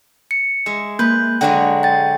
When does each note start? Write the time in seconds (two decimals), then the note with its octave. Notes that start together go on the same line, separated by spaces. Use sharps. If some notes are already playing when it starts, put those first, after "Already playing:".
0.31 C#7
0.66 G#3 E5
0.99 A#3 B4 G6
1.41 D3 F#3 G#3 G5
1.83 G5 A6